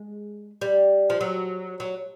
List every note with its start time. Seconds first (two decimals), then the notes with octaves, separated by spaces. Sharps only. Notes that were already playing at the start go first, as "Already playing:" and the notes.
Already playing: G#3
0.61 G3
1.10 F3
1.21 F#3
1.80 F#3